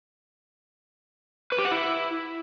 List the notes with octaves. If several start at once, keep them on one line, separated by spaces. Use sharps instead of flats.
B4
G4
F#5
E4